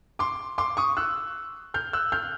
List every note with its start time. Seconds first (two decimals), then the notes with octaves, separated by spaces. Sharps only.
0.19 C6 D6
0.58 C6 D6
0.77 C#6 D#6
0.97 E6 F#6
1.74 F6 G6
1.93 E6 F#6
2.12 F6 G6